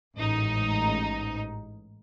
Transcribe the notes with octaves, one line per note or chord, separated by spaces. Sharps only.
A1 G#2 D#4